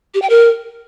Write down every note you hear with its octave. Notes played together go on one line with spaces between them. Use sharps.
G4
G5
A#4